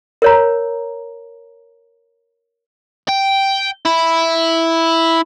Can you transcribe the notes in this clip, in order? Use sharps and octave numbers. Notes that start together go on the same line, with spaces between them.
A#4 C#5 A#5
G5
E4